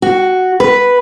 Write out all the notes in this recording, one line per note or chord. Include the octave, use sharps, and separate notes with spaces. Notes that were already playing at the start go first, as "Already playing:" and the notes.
F#4
B4